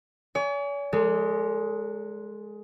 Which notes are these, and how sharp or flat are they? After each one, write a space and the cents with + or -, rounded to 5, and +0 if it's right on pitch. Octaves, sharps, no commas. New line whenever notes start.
C#5 +45 G#5 +0
G#3 +10 A4 +45 D5 +0